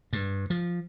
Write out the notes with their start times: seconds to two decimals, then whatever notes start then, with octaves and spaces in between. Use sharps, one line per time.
0.13 G2
0.50 F3